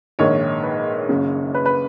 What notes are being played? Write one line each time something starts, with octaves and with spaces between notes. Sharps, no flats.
A#1 G#2 D#3 C#5
B4
B4
C#5
F#1 F#2 C#3
B4
B4